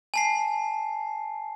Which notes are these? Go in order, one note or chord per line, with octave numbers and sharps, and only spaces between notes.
G#5 A5 C7